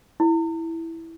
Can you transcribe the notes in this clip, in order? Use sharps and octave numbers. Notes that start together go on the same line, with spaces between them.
E4